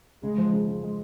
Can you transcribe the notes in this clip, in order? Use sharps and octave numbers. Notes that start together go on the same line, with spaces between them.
C#3 G#3
F3
C#3
C#3
G#3